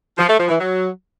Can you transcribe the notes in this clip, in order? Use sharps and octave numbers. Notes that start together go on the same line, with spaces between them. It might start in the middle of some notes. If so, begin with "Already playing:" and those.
F3
A3
F3
E3
F#3